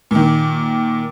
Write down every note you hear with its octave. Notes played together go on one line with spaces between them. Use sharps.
A#2 D#3